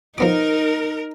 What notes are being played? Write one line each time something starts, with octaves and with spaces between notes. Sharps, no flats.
F3 B3 D#4 A#4 D6